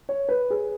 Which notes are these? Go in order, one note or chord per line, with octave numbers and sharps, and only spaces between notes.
C#5
B4
G#4